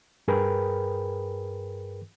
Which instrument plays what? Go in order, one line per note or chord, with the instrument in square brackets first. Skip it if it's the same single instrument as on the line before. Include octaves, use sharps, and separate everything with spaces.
[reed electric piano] G2 G#4 A#4 B4 G5 B5